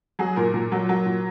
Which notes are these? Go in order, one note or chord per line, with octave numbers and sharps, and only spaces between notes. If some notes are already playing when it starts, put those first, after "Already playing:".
F#3 G#4
A#2 A#4
A#2
F#3
F#3
A#2